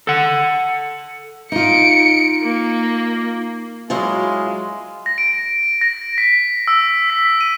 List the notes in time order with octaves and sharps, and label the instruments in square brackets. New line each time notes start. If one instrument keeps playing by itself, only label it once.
[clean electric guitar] A4 F#5
[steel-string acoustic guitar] D#4 F4 [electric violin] C#7 D7
[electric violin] A#3
[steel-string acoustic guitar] F#3 E4 F4 [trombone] G#3
[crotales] A#6
D7
A#6
B6
E6
B6
D#7